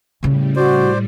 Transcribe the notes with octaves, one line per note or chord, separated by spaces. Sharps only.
A2 C#3 G3 C#4
F#4 C5 D5